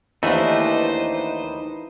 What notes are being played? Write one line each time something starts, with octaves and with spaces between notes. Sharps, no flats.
D#2 E3 A3 D4 D#4 B4 C5